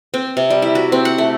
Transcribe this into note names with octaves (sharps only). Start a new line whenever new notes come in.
C4
C3
G3
E4
F#4
C4
F#5
A3